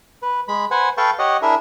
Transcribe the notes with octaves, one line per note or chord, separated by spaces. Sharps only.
B4
G#3 B5
B4 C5 F#5 G#5
A4 B4 F5 G5 A5 C#6
G4 C#5 D#5 F#5
D4 E4 G#4 A#4 E5